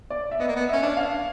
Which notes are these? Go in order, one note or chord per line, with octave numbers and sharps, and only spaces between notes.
D5
E5
B3 D#5
A#3
B3
C#4 E5
D4
F5